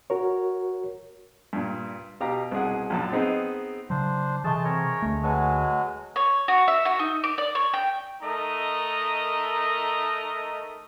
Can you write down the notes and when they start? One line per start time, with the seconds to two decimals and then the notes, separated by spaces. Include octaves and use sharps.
0.10 F#4 A#4 C#5
1.53 G2 A#2
2.20 B2 G4 F5 A#5
2.51 C2 B2 G#4 F#5
2.90 A#1 F#2 A5
3.12 B3 C4 D#4 G#4
3.90 C#3 F#3 D4 C5
4.44 C3 E3 G#3 A3 A5 C6
4.65 C4 A#4 C#5
5.02 D2 A3
5.23 F#3 G#3 F#4 A4 B4 G#5
6.16 C#5
6.48 F#4
6.68 E5
6.85 F#4
6.99 D#4
7.24 D6
7.38 D5
7.55 C#5
7.74 G5
8.23 A3 D#4 A#4 D#5 A#5